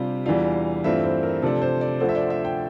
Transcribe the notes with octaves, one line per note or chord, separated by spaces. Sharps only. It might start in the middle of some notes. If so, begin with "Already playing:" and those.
Already playing: C3 G3 D4 F4
E2 E3 G3 D4 F4 F5
G2 E3 A3 C4 F4 E5
C5
A#4
C3 F3 A3 D4 A4
C5
D5
D2 D3 F3 C5
E5
D5
E5
G5